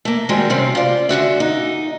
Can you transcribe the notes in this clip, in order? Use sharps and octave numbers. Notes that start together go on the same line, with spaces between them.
A3 A#3
D#3 G3 G#3 C4 F#4
C3 G3 C4 C#4
F4 D5
F#2 D3 F#4 E5
D#4